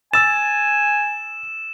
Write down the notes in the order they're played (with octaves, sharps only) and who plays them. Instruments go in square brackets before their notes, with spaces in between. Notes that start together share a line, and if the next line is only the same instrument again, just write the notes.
[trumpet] G#5 [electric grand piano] E6 A6 [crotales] E7